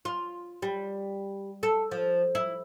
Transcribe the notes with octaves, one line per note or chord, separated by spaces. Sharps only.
F4
G3
A4
F3
E4